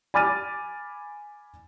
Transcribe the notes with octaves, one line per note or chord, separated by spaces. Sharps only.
G#5 B5 D6 F6 A6 D#7